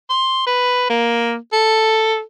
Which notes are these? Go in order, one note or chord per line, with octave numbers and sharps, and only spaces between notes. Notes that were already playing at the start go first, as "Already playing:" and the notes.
C6
B4
A#3
A4